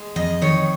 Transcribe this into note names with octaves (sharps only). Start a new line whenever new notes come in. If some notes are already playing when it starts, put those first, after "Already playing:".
Already playing: G#3
F2 D#5
D#3 C#5